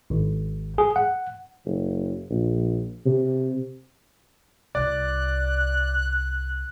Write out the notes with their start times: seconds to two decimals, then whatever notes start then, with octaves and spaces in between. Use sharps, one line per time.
0.10 G#1
0.78 G#4
0.96 F#5
1.65 F#1
2.30 A#1
3.06 C3
4.75 C2 D5 F#6